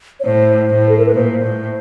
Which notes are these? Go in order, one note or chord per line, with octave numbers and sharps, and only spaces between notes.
C#5
A2 C5
A2
A4
A#4
B4
A#2 C5
A2